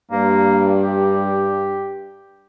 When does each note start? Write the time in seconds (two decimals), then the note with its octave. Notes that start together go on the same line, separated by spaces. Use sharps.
0.11 G2 A#3
0.81 G4